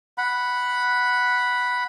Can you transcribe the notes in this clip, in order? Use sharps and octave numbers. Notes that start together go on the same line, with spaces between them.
F#5 B5